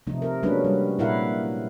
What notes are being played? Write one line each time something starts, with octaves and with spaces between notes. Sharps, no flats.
C3 F3 A3 D#4
A#4
F#3 G#3 A#3 C#4 D4 B4
G3
A#2 E4 A#4 F5 F#5